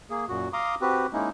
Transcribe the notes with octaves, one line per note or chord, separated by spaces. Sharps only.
A#3 G#4
F#2 A#2 F#4
F5 A#5 C6 D6 D#6
C4 F#4 G4 B4
G#3 A#3 C#4 D#4 E4